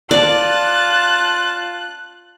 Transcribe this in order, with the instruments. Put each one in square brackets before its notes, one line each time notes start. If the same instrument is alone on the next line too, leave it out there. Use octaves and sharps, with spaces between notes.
[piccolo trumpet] F4 [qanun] D5 [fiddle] A5 [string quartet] F#6